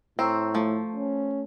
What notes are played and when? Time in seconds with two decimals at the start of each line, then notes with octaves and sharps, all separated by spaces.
0.19 A2 C4 A#5 C#6 E6
0.55 F3 A3
0.96 C#4